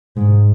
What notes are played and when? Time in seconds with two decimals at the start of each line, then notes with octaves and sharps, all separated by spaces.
0.17 G#2